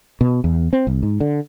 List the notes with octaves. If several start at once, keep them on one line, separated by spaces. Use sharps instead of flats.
B2
E2
C4
C2
G#2
D3